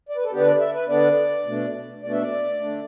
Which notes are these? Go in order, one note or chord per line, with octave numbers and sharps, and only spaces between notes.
D5
B4
A4
D3 B3 D4 G4
B4
D5
E5
B4
D3 B3 D4 D5
B2 A3 D4
B2 A3 D4 D5
E5
D5
D3 A3 D4